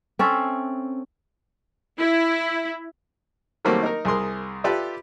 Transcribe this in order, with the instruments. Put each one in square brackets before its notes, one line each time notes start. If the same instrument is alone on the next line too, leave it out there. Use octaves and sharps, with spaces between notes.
[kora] C4 C#4 A4 E5
[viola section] E4
[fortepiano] D#3 F#3 G3 A3 A#3 C4
D#4 A#4
C2 G#4 A#4 C6 D#6
F4 G4 A4 B4 D5 E5